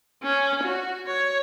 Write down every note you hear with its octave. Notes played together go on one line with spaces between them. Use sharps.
C#4
F#4
C#5